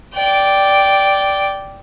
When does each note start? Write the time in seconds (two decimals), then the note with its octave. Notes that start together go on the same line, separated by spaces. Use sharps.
0.15 D5 G5